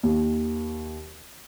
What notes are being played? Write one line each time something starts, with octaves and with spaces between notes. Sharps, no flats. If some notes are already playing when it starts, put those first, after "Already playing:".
D#2